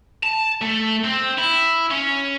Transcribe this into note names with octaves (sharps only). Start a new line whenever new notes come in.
A5
A3
C4
E4
C#4